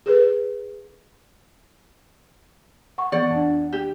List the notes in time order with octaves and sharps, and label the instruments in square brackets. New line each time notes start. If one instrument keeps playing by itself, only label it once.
[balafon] G#4 A4 B4
[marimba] F#5 C#6
[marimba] E3 B3 [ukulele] D5 F#5
[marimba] F2 D4
[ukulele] G4